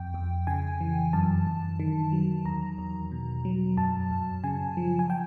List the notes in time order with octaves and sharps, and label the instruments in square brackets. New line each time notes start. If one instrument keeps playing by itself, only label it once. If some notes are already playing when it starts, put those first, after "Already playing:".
Already playing: [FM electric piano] F2 G5
F2
C#3 G#5
E3
F#2 A5
F#2
D#3
F#3
E2 A#5
E2
B2
F#3
F#2 A5
F#2
C#3 G#5
F3
G#5
G5